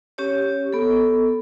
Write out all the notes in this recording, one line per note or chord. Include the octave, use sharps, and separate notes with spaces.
C#4 G4 C#5
B3 A4